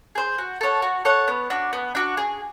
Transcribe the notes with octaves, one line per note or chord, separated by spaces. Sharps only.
G#4 C5
F#4
A4 C#5 F#5
F#4
A4 C#5 F#5
B3
D4 F#4
B3
D4 F#4
G#4